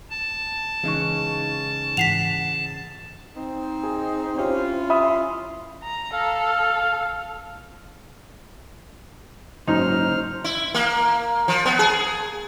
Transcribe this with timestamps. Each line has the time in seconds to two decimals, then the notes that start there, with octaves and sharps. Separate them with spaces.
0.10 A5
0.84 C#3 E3 G#3 D#4 B4 C#6
1.97 G#2 E3 F#5 B6 C7 F7
3.35 C4 D#4
3.83 G#4
4.38 C#4 E4 F4 G4 C5 C#5
4.90 E5 B5 D#6
5.83 A#5
6.13 A4 F5
9.68 F#1 D2 G#2 F#3 D#4 C5 F6
10.44 E4
10.75 A#3
11.48 F3
11.66 B3
11.79 G#4